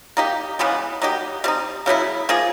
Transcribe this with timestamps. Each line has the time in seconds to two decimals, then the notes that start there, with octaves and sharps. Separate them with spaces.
0.17 A#3 D#4 G4
0.59 C#3 E3 G#3 B3
1.02 F#3 A#3 D#4 G4
1.44 G3 C4 D#4
1.86 C#3 F#3 B3 E4
2.29 F3 A#3 D#4 G#4